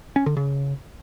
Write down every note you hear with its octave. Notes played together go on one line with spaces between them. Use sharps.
C#4
D3
C#3